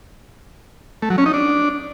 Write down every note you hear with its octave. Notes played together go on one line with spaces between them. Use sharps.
A3
F#3
C#4
D#4
D4